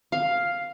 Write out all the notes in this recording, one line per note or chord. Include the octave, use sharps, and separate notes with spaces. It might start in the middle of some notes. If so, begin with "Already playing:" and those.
F5